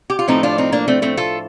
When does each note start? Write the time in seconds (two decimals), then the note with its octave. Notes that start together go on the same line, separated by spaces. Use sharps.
0.10 G4
0.19 F4
0.28 A2 F3 A3 C4 D#4
0.43 D4 F4
0.58 C4 D#4
0.72 A#3 D4
0.88 A3 C4
1.02 A3 C4
1.17 F4 A4